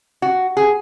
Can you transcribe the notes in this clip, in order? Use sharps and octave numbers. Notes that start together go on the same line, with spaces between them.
F#4
G#4